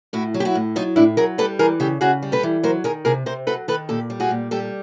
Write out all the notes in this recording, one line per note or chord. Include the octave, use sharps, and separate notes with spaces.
A2 E4 F#4
F#3
G4
E4 F#4
A2
F#3 D#4 F4
A2 D4 E4
F#3 G#4 A#4
G3 A4 B4
E3 G#4 A#4
C#3 G4 A4
C#3 F#4 G#4
G3
A4 B4
E3
F#3 A#4 C5
D#3 G#4 A#4
C3 G#4 A#4
C3 A#4 C5
F#3 A4 B4
D#3 A4 B4
A#2 G4 A4
G3
F#4 G#4
A#2
G3 G4 A4